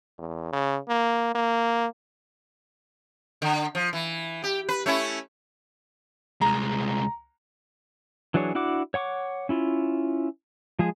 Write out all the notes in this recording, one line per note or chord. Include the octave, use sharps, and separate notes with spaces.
E2
C#3
A#3
A#3
D3
F3
E3
G4
B4
A3 C#4 E4
C2 G#3 A#5
E3 F#3 D4 G#4 C#5
D4 E4 F#4 F#5 D6
C#5 F#5 C#6 D6
C#4 E4 F4
F3 G#3 G#4